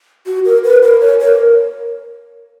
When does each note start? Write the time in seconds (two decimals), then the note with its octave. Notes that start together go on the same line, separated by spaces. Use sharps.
0.26 F#4
0.45 A#4
0.64 B4
0.83 A#4
1.01 C#5
1.20 A#4